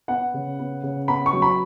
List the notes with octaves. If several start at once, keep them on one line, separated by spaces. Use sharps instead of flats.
B3 F#5
C#3
B3
C#3
B3 B5
C#6
F#3
B5